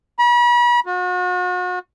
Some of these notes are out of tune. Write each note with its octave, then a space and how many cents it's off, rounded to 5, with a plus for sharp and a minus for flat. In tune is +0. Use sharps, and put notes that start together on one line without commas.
B5 -40
F#4 -40